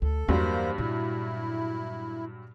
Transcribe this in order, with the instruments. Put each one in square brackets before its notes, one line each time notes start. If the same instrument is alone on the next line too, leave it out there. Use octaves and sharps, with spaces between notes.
[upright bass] D2 [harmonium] A4
[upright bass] E2 [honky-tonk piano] G2 F#3 [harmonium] A#3 C5
[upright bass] A#2 F4 [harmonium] E4